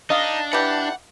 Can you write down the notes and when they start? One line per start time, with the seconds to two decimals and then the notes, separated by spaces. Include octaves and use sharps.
0.10 D4 D#4 D#5 F5
0.53 E3 G4 F#5